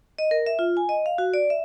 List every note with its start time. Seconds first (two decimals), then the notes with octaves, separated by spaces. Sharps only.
0.19 D#5
0.31 A#4
0.46 E5
0.59 F4
0.77 G#5
0.89 D#5
1.06 F5
1.18 F#4
1.34 D5
1.50 E5